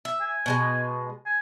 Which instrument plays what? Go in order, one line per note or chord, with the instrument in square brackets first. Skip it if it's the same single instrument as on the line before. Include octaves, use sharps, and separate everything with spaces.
[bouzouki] E5
[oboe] G#5
[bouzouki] B2 G3 G#3
[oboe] G#5